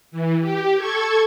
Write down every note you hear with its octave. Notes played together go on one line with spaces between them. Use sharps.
E3
G4
A4 C#6 G#6